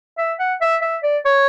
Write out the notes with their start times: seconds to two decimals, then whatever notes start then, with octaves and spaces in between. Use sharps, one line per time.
0.18 E5
0.40 F#5
0.61 E5
0.82 E5
1.03 D5
1.25 C#5